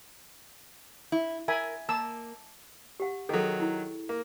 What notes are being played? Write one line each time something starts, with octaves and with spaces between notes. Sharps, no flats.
E4
A#4 E5 G#5 B5
A#3 A5 E6
G4 F#5
D#3 F#3 G#4 A4
E4
A#3